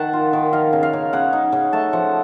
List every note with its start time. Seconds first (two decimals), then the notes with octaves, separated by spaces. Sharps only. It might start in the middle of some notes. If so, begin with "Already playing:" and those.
Already playing: D#3 F#5 A5
0.13 F4
0.33 D#3
0.53 D#4 F5
0.73 C#3
0.83 F5
0.93 C#3
1.13 C#3 F#5
1.33 D#4
1.52 C#3
1.73 A3 A5
1.93 F3 F#5